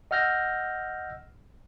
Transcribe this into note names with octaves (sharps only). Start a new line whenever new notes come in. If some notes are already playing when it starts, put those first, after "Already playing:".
D#5 F#5 E6 F6 G6 A#6